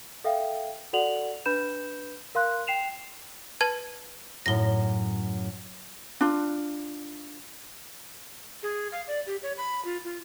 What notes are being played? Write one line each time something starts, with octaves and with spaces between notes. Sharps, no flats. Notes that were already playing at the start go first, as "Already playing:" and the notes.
A4 E5 F5 G5
F#4 A4 D5 F#5 F7 F#7
D4 B4 B5 G6 E7
A#4 F5 C6 F#6
G5 C7 E7 F7
B4 A5 G#6
F#2 A2 A#6 G7
D4 F4
G#4
F5
D5
G4
C#5
B5
F4
F4